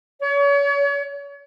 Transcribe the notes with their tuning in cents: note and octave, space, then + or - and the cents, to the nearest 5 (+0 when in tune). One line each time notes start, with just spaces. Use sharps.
C#5 +35